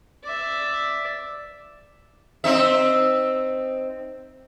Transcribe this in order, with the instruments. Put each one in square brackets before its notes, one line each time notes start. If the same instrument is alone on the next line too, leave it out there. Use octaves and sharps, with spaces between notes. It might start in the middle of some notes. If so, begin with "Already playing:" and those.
[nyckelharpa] D5 E5
[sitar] C4 D#4 E5